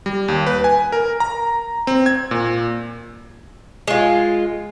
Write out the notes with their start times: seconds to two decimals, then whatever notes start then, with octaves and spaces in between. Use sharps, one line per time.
0.06 G3
0.28 D#2
0.46 B4
0.64 G#5
0.92 A#4
1.20 A#5
1.87 C4
2.06 G#6
2.31 A#2
3.87 G#3 F4